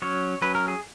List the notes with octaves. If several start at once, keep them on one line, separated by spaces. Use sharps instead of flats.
F#3 C#4 C#5
F#3 C#4 B4
A#4
G#4